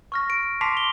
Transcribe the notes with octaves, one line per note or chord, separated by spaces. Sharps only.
C#6 F6 A#6
D7
A5 C6 D6 B6 C7 F7
G7